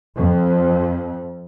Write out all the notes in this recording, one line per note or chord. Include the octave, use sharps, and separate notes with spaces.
F2